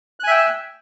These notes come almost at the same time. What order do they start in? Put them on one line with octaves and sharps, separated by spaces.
F#6 G#5 E5 G5 E6